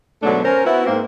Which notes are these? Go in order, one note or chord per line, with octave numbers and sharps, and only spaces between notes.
G#2 B2 D3 F#3 A3 D4
C#4 A#4 C5
B3 E4 F#4
G#2 A#3 C4